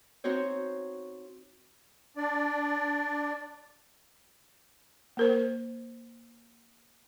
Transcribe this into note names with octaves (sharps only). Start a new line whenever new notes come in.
C4 D#4 F#4 C5 C#5
D4 D5
A#3 A#4 C5